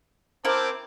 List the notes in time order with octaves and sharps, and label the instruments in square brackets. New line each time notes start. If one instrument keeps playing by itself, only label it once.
[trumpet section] C4 A5 D6 [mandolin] E4 A#4 [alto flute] C5